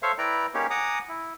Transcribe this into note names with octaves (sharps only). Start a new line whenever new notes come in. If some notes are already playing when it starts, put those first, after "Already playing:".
A4 C5 C#5 E5 F5
E4 B4 D5 G5 A#5
A#3 C#4 D#4 G4 G#4 C#5
F#5 G#5 A#5 D6 D#6
E4